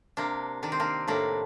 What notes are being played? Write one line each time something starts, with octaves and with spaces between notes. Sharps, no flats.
C3 A#3 D4
D#3 D4
C4
A#3 D4
A2 A#3 D4